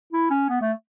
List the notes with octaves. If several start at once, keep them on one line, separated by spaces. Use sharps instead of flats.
E4
C#4
B3
A3